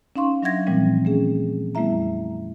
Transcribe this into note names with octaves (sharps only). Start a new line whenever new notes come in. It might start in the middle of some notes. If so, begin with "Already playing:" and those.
C#4 D#4 F5 C6 C#6
F#3 D4 E5 F#5 G#6 A#6
A#2 E3 F3 G3 A3 C4
A3 C#4 G#4
G3 A3 B3 E4 E5 A#5
F2